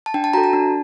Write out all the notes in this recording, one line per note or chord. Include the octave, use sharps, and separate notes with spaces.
A5
D4 G5
A5
F#4 A4 A#5
A5
D4